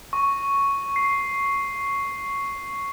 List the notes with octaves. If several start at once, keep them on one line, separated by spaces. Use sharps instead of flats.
C#6
C7